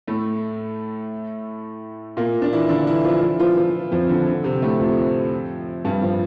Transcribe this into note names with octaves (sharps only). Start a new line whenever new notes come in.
A2 A3
A#2 A#3
D4
E3 E4
D3 D4
E3 E4
F3 F4
E3 E4
F3 F4
F3 F4
F2 F3
D3
D3
C3 C4
A2 A3
F2 F3
G2 G3
F3